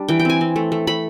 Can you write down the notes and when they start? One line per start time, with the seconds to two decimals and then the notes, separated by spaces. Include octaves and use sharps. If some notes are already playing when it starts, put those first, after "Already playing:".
Already playing: G3 D4
0.08 E3 G5
0.20 G5
0.25 C4 G#5
0.41 C4
0.56 A3
0.72 A3
0.87 A3 B5